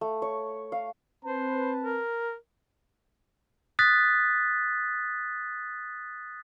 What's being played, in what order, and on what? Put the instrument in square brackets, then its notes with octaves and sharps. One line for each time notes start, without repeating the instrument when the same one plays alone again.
[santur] A3
C#5
F5
[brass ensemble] C4 B4 A5 [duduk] C5
[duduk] A#4
[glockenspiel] D#6 F#6 A6 B6